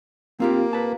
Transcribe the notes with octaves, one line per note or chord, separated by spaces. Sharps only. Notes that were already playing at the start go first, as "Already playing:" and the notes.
A#3 C4 F4 G4
B4 A5